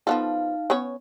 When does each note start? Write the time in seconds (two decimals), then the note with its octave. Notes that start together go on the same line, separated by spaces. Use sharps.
0.07 F3 B3 D#4 A4 F5
0.70 B3 C#4 C#5